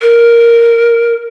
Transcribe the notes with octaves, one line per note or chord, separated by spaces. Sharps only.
A#4